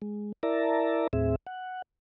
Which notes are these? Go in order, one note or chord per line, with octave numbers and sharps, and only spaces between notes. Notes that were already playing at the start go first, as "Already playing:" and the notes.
G#3
E4 A#4 D5 E5 A5 A#5
D#2 A2 C4 G#4 E5
F#5